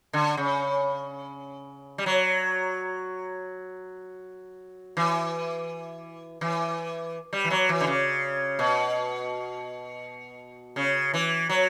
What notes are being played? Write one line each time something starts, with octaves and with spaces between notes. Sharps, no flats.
D3
C#3
G3
F#3
E3
E3
G3
E3
F#3
E3
D3
C#3
B2
C#3
E3
F#3